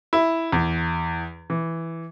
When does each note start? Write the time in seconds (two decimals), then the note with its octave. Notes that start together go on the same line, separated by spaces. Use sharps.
0.13 E4
0.52 E2
1.50 E3